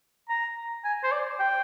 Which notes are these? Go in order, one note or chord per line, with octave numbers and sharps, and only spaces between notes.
A#5
G#5
C5
D5
G5